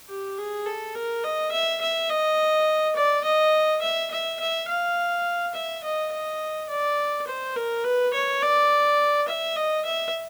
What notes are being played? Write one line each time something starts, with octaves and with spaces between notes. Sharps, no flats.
G4
G#4
A4
A#4
D#5
E5
E5
D#5
D5
D#5
E5
E5
E5
F5
E5
D#5
D#5
D5
C5
A#4
B4
C#5
D5
E5
D#5
E5